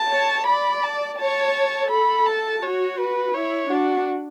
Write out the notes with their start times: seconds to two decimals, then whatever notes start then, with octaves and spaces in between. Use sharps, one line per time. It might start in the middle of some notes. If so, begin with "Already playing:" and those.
Already playing: A5
0.10 C#5
0.46 D5 B5
0.83 A5
1.18 C#5 A5
1.90 A4 B5
2.26 A5
2.62 F#4 C#5
2.98 B4
3.34 E4 C#5
3.70 D4 F#4